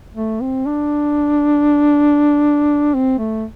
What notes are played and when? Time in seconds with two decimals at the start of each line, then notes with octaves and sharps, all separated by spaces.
0.16 A3
0.41 C4
0.66 D4
2.94 C4
3.18 A3